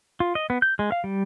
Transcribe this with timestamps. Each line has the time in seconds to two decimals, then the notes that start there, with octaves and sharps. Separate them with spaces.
0.20 F4
0.35 D#5
0.50 B3
0.62 G6
0.79 G#3
0.92 F5
1.04 G3